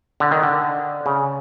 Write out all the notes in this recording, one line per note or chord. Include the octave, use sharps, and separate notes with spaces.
D3
D#3
D3
C#3